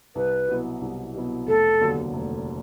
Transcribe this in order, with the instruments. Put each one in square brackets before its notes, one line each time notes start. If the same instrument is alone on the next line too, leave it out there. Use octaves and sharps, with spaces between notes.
[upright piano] C2 [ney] B4
[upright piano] B2 F#3 B3 E4
C2
B2 F#3 B3 E4
[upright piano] F1 [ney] A4
[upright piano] D#2 D3 F#3 B3
F1